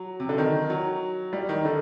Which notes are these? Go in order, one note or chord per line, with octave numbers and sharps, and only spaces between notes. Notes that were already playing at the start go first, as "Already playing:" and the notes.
Already playing: F#3
C3
D3
D#3
F#3
G3
D#3
D3